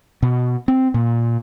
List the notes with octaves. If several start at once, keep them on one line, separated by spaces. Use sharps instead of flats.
B2
C4
A#2